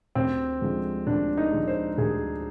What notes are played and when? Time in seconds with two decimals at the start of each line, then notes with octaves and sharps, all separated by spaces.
0.15 D2 C4
0.61 D3 F3 G#3
1.07 D2 D4
1.37 D#4
1.52 D3 F3 G#3
1.68 C5
1.98 D2 G#4